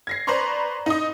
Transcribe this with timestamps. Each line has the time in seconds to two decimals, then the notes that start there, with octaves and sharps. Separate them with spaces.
0.07 G#6 A#6 C7
0.27 B4 C5 D5 A#5 C6 C#6
0.86 D#4 D#5